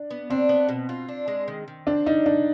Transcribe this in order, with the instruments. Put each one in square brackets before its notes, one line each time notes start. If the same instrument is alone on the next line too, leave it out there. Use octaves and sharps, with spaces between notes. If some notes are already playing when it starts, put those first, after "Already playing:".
Already playing: [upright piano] D4
[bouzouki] B3
[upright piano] C4 [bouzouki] D4
[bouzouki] B3
B2
F4
D4
G#3
D#3
D#3
[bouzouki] C4 [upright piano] D4
[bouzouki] G3 [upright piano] D#4
[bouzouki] D#3 [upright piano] D4